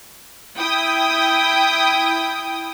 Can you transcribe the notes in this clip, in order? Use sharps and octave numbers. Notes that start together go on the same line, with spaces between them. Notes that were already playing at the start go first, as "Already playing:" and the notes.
E4 G5 D#6